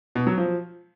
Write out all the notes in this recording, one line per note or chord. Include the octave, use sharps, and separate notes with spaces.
B2
F#3
F3